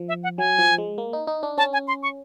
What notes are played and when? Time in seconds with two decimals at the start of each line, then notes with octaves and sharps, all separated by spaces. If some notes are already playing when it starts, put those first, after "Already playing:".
Already playing: F3
0.08 E5
0.23 F#5
0.38 F#3 G#5
0.58 F3
0.78 G#3
0.98 A#3
1.13 D#4
1.27 D#4
1.43 D4
1.58 C#4 A5
1.73 G#5
1.88 C6
2.03 C#6